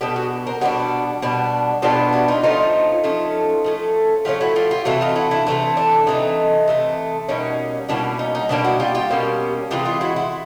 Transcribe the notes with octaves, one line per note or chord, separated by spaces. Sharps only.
B2 G3 B3 D4 G4 A4
F#4 G#4
A#4 C5
B2 G3 B3 D4 F#4 G#4
B2 G3 B3 D4
B2 G3 B3 D4 F4 G4
E4 F#4
D#4 F4
F3 A3 C#4 D#4 F4
F3 A3 C#4
F3 A3 C#4
F3 A3 C#4 F4 G4
E4 F#4
F4 G4
F4 G4
C3 E3 A3 E4 F#4
D#4 F4
E4 F#4
D4 E4
C3 E3 A3
D4
C3 E3 A3 D#4
C3 E3 A3
B2 G3 A#3 C#4 D#4
B2 G3 A#3 C#4 D4 E4
D#4
D#4
B2 G3 A#3 C#4 D4 E4
E4 F#4
F4 G4
F4 G4
B2 G3 A#3 C#4
C3 E3 G#3 F4 G4
F4 G4
E4 F#4
E4 F#4